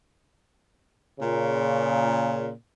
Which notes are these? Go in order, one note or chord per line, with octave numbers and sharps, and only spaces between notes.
A#2 C#3